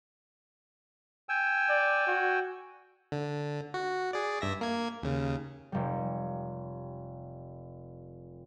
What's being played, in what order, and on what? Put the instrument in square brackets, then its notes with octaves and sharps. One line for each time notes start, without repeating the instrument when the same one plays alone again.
[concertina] G5 G#5 E6
[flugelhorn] D5
F#4
[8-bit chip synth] D3
F#4
G#4 D5
G2 E5 A#6
A#3 G#6
D#2 C#3
[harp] F1 G3